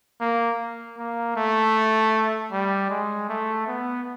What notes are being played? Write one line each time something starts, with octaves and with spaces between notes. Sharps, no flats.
A#3
A#3
A3
G3
G#3
A3
B3